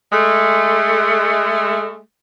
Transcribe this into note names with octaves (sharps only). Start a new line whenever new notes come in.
G#3 A3